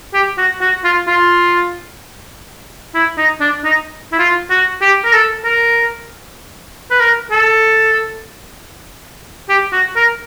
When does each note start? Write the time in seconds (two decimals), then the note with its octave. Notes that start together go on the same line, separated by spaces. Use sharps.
0.14 G4
0.38 F#4
0.61 F#4
0.84 F4
1.07 F4
2.95 E4
3.18 D#4
3.41 D4
3.64 D#4
4.13 E4
4.19 F4
4.50 F#4
4.81 G4
5.04 A#4
5.13 A4
5.44 A#4
6.91 B4
7.00 A#4
7.31 A4
9.49 G4
9.72 F#4
9.96 A#4